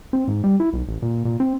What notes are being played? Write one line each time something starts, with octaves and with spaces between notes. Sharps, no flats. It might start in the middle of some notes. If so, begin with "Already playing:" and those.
C4
G#2
G3
E4
B1
A1
A#2
A#2
C4